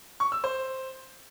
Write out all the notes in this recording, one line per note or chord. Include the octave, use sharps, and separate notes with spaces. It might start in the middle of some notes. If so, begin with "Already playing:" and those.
C#6
E6
C5